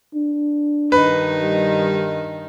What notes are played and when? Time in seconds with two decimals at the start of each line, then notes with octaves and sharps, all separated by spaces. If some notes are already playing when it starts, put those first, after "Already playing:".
0.15 D4
0.92 G2 D#3 D#4 B4
1.42 G3